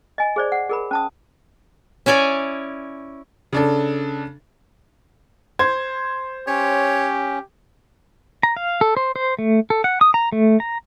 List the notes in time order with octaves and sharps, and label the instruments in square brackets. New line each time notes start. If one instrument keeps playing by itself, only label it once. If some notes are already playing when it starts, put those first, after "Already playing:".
[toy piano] D#5 G#5
G#4 C5 D5
F#5
G#4 A#4 B5
C#4 A5 D#6
[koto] C#4 E4 C#5 D5 G#5
[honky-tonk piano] C#3 D4 A4
[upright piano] C5 G#6
[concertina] C#4 [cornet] G4 [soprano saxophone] C#5
[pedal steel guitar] A#5
F5
A4
C5
C5
A3
A4
F#5
D#6
A#5
A3
A#5